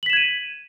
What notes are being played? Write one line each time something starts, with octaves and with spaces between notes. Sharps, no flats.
G#6 B6 D#7 E7 F#7